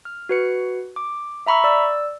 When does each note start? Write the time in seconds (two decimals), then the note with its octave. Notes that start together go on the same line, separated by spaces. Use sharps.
0.05 F6
0.29 F#4 B4 C#7
0.96 D6
1.47 E5 A#5 B5 C#6 E6
1.64 D5 E6